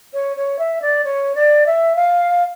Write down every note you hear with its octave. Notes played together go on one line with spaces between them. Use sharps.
C#5
C#5
E5
D5
C#5
D5
E5
F5